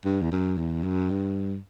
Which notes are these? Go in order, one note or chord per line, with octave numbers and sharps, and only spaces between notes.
G2
E2
F#2
E2
F#2
G2